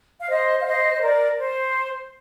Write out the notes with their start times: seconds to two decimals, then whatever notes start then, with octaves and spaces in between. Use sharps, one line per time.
0.19 F5
0.29 C5 D#5
0.61 F5
0.66 C5 D#5
0.94 C5
1.02 A#4 D5
1.38 C5